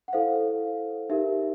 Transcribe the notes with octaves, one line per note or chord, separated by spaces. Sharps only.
F#5
E4 A4 C5 F5
D#4 G4 A#4 E5